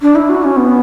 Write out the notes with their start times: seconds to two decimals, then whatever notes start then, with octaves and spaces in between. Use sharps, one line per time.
0.02 D4
0.15 E4
0.29 F#4
0.43 C#4
0.57 B3